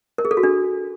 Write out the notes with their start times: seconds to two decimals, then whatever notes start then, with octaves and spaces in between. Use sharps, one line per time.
0.18 A#4
0.25 G#4
0.31 A4
0.37 F#4
0.43 D4